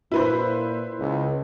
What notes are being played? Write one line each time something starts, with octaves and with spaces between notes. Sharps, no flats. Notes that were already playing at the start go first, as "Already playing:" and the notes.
A#2 E4 B4 C5
C#2